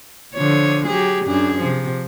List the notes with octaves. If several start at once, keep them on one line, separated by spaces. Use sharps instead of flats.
D3 F3 C#5
F#3 G4 G#4
F#2 D4 G#4
C3 F3